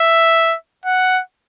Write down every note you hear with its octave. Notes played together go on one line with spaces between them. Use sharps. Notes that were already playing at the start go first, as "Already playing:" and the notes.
Already playing: E5
F#5